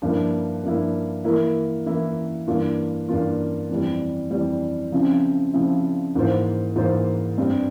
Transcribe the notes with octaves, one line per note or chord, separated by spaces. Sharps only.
G2 F3 A#3 E4
G2 F3 A#3 E4
E3 A#3 E4 A#4
E3 A#3 E4 A#4
G2 E3 A#3 F4
G2 E3 A#3 F4
F2 E3 G3
F2 E3 G3
C#3 F3 C4 E4
C#3 F3 C4 E4
G#2 E3 A#3 F4 C5
G#2 E3 A#3 F4 C5
G2 G3 C4